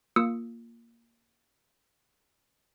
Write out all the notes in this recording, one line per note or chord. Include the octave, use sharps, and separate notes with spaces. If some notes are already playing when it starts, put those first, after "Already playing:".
A#3 F4 D#6 E6 C#7